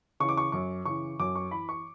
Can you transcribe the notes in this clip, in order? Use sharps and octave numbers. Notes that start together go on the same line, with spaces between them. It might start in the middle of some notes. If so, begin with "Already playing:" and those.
C#3 E3 C#6
D6
C#6
F#2 C#6
C#3 E3 C#6
F#2 D6
C#6
E3 B5
C#6